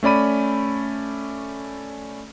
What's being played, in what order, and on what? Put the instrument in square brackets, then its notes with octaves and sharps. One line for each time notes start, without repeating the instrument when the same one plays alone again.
[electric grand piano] A3 C#4 D5 B5 D#7